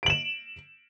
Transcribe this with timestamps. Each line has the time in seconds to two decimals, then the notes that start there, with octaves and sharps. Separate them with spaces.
0.03 D7
0.06 F#7
0.10 E7